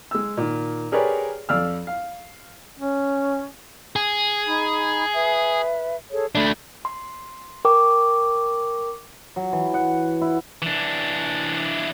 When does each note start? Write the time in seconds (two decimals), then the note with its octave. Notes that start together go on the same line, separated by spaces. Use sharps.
0.11 G#3 E6
0.37 A#2 D#3
0.92 G4 G#4 A#4 B4 C#5 D5
1.49 F2 D5 F5 E6 F6
1.87 F5
2.79 C#4
3.96 G#4
4.47 D#4 B5
5.13 B4 E5
6.11 G#4 A4 C#5
6.35 A3 D4 B5
6.85 C6
7.65 A#4 G5 C#6 D6
9.36 F#3
9.53 E3
9.74 F#5
10.21 E4
10.62 E3 D4